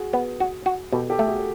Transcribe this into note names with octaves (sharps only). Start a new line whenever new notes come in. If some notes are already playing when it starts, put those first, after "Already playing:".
Already playing: F#4 G#4
B3
F#4
F#4
B2 G4 A4
G4 A4
A3
F#4 G#4